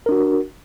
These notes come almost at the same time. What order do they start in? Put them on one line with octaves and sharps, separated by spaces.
A#4 D4 F#4